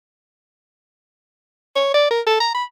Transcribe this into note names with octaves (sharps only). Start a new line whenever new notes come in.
C#5
D5
A#4
A4
A#5
B5